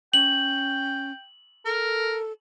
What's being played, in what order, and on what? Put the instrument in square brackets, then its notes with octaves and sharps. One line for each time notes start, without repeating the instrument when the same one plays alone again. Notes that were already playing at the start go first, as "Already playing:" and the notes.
[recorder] C#4 [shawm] G5 [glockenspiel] F#7
[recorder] A4 [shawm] A#4